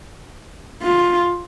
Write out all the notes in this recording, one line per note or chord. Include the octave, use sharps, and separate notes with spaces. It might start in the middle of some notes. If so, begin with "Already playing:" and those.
F4